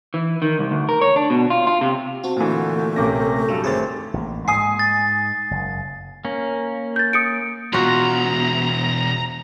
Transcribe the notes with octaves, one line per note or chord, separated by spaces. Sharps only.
E3
D#3
C2
D2
A#4
C#5
D4
B2
F4
F4
C3
C4 F#4 A5
A#2 D3 E3 A3
A#1 C3 A#3 C#4 D6 A#6
G2 F#3 G3 A4
A1 D#3 C4 G#4 A6
A1 A#3
G#2 G#3 G#5 D#6 C7
A6
F#1
A#3 C#4
G6 A6
D#6 C#7 D7
E2 B2 F4 F#4 A#5